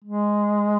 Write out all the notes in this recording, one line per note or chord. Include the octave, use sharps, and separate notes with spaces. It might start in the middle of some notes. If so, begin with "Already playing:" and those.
G#3